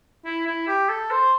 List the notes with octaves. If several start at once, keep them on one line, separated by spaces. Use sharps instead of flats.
E4
E4
G4
A4
C5